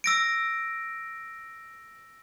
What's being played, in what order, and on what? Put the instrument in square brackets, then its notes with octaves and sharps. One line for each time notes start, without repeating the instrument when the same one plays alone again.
[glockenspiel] E6 A#6 D7